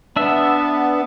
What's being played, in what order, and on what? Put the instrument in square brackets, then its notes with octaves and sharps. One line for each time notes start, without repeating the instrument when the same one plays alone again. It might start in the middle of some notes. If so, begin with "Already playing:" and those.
[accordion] B3 [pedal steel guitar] D4 E5